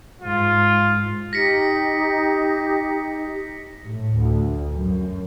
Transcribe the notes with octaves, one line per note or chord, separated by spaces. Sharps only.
G#2 F4
D#4 G4 A#6 B6 C#7
A2
D2
F#2